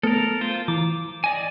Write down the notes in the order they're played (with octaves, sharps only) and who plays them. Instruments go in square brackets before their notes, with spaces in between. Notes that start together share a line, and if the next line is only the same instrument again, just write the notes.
[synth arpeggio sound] A3 B3 [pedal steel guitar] A4 A#4
[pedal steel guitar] F4 C5
[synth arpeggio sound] E3 [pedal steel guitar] D6
[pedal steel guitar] D5 D#5 G#5